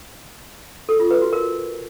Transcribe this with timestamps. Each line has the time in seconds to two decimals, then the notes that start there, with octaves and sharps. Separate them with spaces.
0.89 A4
1.00 F4
1.11 B4
1.22 F#4
1.33 A#4